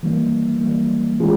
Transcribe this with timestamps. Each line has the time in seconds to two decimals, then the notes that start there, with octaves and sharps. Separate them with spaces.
0.03 E3 G3 A#3
0.61 E3 G3 A#3
1.20 E3 G#3 C#4 F4 G#4